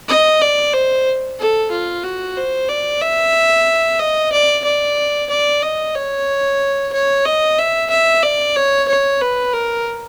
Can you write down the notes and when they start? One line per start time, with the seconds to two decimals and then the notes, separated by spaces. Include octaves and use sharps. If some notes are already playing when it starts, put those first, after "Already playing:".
0.09 D#5
0.42 D5
0.73 C5
1.39 A4
1.71 F4
2.04 F#4
2.37 C5
2.69 D5
3.01 E5
4.00 D#5
4.32 D5
4.65 D5
5.30 D5
5.62 D#5
5.95 C#5
6.93 C#5
7.26 D#5
7.58 E5
7.90 E5
8.23 D5
8.56 C#5
8.89 C#5
9.21 B4
9.53 A#4